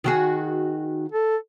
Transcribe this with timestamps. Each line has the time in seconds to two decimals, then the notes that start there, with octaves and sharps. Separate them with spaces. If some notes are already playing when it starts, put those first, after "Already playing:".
0.04 D#3 F#4 G#4
1.12 A4